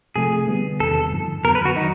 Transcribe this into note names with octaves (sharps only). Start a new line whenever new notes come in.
C3 F3 A3 G#4
D3 G3 B3
E2 C3 D#3 A4
G2 D3 F3
F2 D3 F#3 B3 A#4
B4
F#4
D#3 F#3 D#4